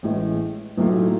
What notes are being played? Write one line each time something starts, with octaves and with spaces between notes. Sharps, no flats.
A1 A2 G#3
B1 A2 F#3 A3 F4